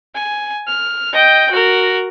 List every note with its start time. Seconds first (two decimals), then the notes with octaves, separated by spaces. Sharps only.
0.15 G#5
0.67 F6
1.13 D#5 G5
1.50 F#4 A#4